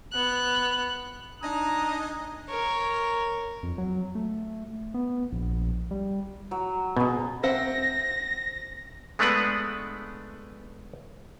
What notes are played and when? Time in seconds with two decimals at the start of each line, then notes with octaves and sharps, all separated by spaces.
0.12 B3 F#6
1.43 D4 D#4 D#5 G#5 A#5 D#6
2.49 A#4 C#5
3.63 F2
3.78 F#3
4.15 A3
4.94 B3
5.32 A#1
5.91 G3
6.51 F#3
6.97 B2 C#4 G#4
7.43 C4 E5 F#5 A#6
9.19 G#3 A3 B3 D4 B4 F#5